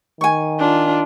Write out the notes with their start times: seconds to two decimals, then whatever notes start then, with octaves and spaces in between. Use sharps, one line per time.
0.21 D#3 G#5 C#6
0.59 D4 F4